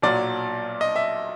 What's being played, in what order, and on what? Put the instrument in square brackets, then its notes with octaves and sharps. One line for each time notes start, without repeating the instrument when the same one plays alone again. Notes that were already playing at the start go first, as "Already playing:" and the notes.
[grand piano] B1 A#2 F#3 D5
D#5
E5